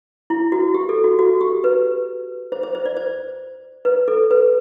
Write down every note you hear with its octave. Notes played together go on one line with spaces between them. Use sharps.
E4
F#4
G4
A4
F#4
F#4
G4
B4
C5
C5
C5
D5
C5
B4
A4
B4